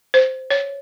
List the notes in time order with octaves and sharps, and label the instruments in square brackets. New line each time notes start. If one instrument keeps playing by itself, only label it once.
[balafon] C5
C#5